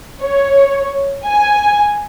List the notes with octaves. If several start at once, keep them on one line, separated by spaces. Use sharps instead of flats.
C#5
G#5